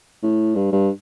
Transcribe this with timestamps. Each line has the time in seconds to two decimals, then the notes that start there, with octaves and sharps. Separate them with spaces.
0.23 A2
0.55 G2
0.72 G2